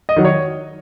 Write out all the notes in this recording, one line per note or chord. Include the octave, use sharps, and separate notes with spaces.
D#5
D#3 F#3
C#5